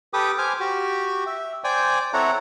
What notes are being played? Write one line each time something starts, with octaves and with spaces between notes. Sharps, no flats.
G4 A4 B4 G5 D6 D#6
C5 G#5 D6 F6
F#4 G4
E5
C5 D5 G5 G#5
C4 E4 A4 C#5 F#5 A#5